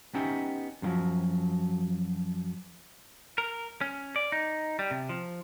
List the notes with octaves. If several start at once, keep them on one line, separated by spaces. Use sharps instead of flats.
B3 C#4 D#4 G4 E5
F#2 C3 D#3 F3 F#3
A#4
C#4
D5
D#4
G3
C3
F3